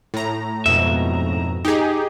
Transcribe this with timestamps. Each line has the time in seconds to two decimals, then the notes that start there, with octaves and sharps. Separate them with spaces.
0.14 A2 A#5
0.66 F2 G#2 B2 E5
1.65 D#4 G4 G#4